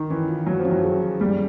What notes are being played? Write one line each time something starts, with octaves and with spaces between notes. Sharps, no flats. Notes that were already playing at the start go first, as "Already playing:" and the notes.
Already playing: D#3
E3 C#4
F4
F#3 C#4
F3
C#4
F#3
G#4
C#4
G3 G#4